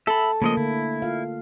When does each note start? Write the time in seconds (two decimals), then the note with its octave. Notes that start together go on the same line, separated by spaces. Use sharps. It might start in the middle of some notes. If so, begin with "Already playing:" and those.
0.07 A4 E5 B5
0.42 C#3 F3 A3 A#3 D#5
0.57 D3 E4
1.02 F4 F5